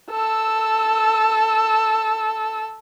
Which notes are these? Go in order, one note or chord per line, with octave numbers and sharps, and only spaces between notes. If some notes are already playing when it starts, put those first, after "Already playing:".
A4 E6